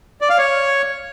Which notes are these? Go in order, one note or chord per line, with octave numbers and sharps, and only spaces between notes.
D5
F5
C#5